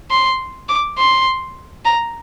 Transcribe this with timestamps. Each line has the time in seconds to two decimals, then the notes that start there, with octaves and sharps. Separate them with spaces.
0.11 C6
0.69 D6
0.98 C6
1.85 A#5